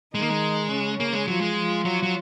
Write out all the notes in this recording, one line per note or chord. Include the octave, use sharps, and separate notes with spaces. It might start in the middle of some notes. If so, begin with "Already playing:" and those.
D#3 G#3 D#4
A#3
G#3
C#3 C#4
A#3
G#3
F3 F#3 F4
G#3
F3 F4
F#3
F#3